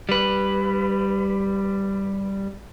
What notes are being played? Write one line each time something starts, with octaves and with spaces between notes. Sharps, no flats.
G3 B4